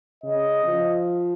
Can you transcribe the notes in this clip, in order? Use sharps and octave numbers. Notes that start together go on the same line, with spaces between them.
C#3 D#5
F3